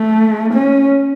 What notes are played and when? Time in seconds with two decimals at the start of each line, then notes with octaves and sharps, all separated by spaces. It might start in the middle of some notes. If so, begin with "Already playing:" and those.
Already playing: A3
0.53 C#4